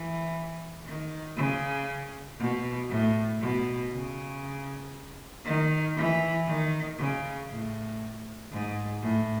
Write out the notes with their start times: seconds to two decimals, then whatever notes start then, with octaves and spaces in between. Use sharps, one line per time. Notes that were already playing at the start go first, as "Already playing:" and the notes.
Already playing: E3
0.87 D#3
1.38 C#3
2.39 B2
2.90 A2
3.41 B2
3.92 C#3
5.45 D#3
5.96 E3
6.48 D#3
6.99 C#3
7.49 A2
8.52 G#2
9.02 A2